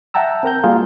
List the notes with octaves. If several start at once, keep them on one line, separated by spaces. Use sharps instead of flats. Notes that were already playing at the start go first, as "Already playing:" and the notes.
E5 F#5 G5 A5 A#5 E6
C4 A#4 A#5 G6
G3 A#3 F4 F#4 G#4 F5